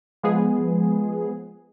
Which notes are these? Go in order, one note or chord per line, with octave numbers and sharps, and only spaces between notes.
F3 G#3 B3 G#4